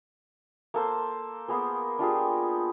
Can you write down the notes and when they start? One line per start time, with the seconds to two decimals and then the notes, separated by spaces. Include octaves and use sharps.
0.74 A#3 A4 C5
1.48 A#3 B3 G#4 C5
1.99 D4 F4 G4 G#4